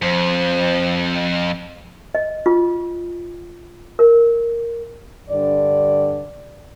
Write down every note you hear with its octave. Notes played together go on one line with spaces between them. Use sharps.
F2 F3
D#5
F4
A#4
G2 D3 D5